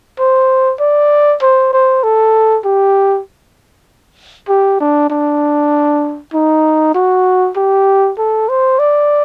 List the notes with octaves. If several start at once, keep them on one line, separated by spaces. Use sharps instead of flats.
C5
D5
C5
C5
A4
G4
G4
D4
D4
D#4
F#4
G4
A4
C5
D5